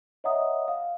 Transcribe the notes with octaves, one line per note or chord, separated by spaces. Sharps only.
C#5 D#5 E5 F#5 A#5 D#6
F5